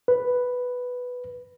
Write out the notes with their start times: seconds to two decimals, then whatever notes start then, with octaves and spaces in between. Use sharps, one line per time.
0.08 B4